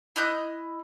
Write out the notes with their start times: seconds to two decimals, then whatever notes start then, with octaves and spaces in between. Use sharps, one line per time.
0.16 E4 D#5 F#6 G6